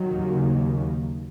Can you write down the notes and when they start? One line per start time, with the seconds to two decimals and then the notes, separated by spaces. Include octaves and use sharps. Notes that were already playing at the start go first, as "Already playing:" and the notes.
Already playing: D#3 F#3
0.13 D#2 C#3